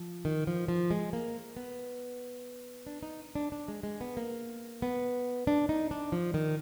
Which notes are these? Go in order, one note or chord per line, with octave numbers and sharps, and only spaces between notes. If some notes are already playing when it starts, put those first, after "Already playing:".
Already playing: F3
D#3
F3
F3
G#3
A#3
B3
D4
D#4
D4
D4
G#3
G#3
B3
A#3
B3
D4
D#4
D4
F3
D#3